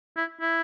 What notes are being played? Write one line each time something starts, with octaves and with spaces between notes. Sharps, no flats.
E4
E4